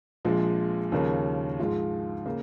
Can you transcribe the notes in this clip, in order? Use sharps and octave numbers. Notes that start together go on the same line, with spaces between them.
A#1 A#2 F3 G#3
D#2 C#3 F3 C#4 A#4
G#2 F3 G#3 F4
C#3 A#3